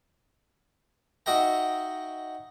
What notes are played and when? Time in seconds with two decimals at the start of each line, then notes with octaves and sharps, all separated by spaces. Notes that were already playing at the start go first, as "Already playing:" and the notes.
1.26 D#4 F#4 D#5 E5 G5 A#5